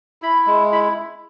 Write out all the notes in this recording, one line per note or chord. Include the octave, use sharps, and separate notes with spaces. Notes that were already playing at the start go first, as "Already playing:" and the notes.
E4 B5
G#3
E4 B5